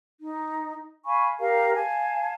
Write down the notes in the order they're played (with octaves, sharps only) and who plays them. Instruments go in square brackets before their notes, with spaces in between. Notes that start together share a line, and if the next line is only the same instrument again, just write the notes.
[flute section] D#4
F5 G#5 B5 C#6
G4 A#4 F5 A#5
F5 G#5 A5